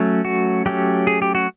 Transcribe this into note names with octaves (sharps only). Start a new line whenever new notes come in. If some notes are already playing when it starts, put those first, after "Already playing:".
Already playing: F#3 A3 C#4
F#4
F#3 A3 C#4 G4
G#4
G4
F#4